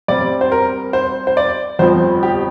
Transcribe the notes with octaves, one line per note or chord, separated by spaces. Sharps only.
G2 G3 C4 D5
C5
A#4
C5
C5
D5
G1 F2 F3 C4 C5
G4